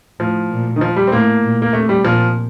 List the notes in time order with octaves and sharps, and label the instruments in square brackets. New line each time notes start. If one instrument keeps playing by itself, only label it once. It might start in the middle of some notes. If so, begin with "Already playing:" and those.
[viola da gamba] A2 [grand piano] F3
[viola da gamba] A#2
[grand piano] D#3
F3
G3
C4
[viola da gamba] A2 [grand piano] A#3
[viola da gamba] A#2
[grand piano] A#3
[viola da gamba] C3 [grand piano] A3
[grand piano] G3
[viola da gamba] A#2 [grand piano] F3